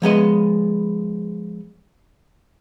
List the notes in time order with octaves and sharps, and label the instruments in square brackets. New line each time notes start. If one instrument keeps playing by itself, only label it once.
[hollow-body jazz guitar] F3 G#3 B3 D#5